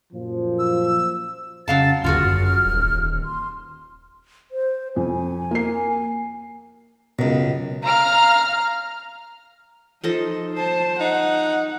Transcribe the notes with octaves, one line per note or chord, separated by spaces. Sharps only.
F#2 A#2 F3
E6
F2 C#3 F#3 C#4 F5 A5 A6
G1 D#2 F4 F#4 G#4 F6
F#2
D#1
C6
C5
F2 G#5
A#3 C7
C#2 F#2 B2
F5 A#5 F6
F3 D#4 A4 D#5
C5 A5
D#4 F#5